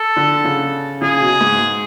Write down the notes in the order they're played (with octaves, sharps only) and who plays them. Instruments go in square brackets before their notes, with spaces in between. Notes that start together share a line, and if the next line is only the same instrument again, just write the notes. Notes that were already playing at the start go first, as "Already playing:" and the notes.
Already playing: [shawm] A4
[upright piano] D3
C#3
[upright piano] C#3 [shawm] G#4
[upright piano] B2
G#2